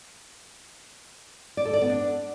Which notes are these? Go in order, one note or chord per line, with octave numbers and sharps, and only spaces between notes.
D5
A4
D5
B3
D4